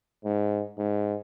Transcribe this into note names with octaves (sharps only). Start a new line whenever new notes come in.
G#2
G#2